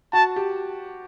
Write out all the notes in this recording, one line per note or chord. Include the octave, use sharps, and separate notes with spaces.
F#4 A5
G4